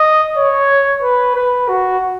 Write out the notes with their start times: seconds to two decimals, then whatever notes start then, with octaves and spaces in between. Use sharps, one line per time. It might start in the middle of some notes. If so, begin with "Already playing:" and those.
Already playing: D#5
0.37 C#5
1.03 B4
1.35 B4
1.68 F#4